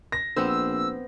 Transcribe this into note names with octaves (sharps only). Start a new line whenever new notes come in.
A#6
A#1 B3 C4 C5 E6